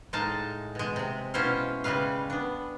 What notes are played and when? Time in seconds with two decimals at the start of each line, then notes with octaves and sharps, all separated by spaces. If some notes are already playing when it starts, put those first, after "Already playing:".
0.13 A2 G#3 D#4 F5 A5
0.75 B2 G#3
0.96 C3 G#3
1.34 B2 C#4 E4 C5 F5
1.84 C#3 G3 G#3 B4 F5
2.30 B3 D4